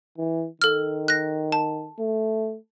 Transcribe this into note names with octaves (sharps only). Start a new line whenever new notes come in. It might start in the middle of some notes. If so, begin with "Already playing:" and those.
E3
D#3 A4 F6
F#6 A#6
A5
A3